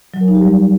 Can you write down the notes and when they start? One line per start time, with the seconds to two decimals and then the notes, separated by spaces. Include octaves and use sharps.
0.14 F#3
0.21 A#4
0.28 D#4
0.35 G4
0.42 G3